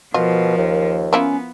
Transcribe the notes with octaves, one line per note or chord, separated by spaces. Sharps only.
B2 F3 F4 A#4
D#2
A#3 B3 C#4 E4 F4